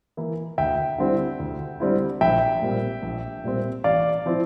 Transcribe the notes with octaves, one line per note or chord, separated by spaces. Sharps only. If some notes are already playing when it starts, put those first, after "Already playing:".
E3 A#3 E4
D2 E5 G5
D3 G3 C4 E4
D2
D3 G3 C4 E4
A#1 E5 G5
A#2 G3 C4
A#1
A#2 G3 C4
A1 D5 F5
F3 C4 E4